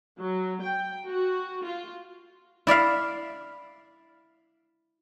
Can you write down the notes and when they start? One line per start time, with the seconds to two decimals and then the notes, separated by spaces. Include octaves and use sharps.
0.19 F#3
0.64 G5
1.08 F#4
1.63 F4
2.67 E4 D5 E5 F5